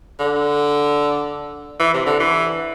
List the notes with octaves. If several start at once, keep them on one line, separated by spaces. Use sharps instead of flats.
D3
E3
C3
D3
E3